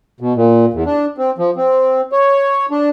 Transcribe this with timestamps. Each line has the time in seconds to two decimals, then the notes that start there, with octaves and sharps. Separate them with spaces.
0.20 B2
0.36 A#2
0.73 E2
0.86 D4
1.18 C4
1.38 F3
1.57 C4
2.12 C#5
2.71 D4